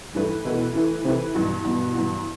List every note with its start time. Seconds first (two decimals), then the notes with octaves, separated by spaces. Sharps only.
0.14 G2 E3 A3 E4 B4
0.45 B2 E3 A3 E4 B4
0.74 E3 A3 E4 B4
1.04 C3 E3 A3 E4 B4
1.35 G2 B2 E3 B3 F#4
1.65 G2 B2 E3 B3 F#4
1.95 G2 E3 B3 F#4